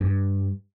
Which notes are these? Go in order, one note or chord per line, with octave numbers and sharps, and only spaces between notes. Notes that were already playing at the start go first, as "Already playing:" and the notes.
G2